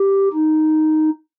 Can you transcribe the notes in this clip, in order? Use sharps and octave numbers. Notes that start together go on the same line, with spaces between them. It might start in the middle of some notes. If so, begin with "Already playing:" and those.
Already playing: G4
D#4